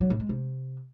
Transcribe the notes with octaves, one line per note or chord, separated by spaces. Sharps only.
F#3
A2
G#3
C3